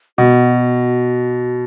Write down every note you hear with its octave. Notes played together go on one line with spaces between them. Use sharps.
B2 F#4